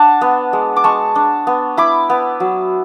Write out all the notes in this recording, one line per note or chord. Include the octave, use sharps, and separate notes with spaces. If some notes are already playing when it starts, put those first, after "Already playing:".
Already playing: D4 F#5 A5
B3
G#3
D6
G#3 A5 C#6
D4
B3
E4 B5 D6
B3
F#3